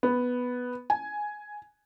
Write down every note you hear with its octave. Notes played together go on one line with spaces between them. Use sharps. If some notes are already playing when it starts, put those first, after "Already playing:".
B3
G#5